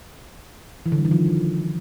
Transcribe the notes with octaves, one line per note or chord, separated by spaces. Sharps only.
E3
D3
G3
D#3
F3